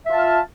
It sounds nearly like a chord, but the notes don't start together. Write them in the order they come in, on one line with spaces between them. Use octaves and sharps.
E5 F4 A5 F5